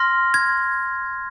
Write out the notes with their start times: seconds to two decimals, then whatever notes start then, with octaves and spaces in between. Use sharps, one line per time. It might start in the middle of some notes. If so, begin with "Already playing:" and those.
Already playing: C6 F6 A#6
0.34 G#6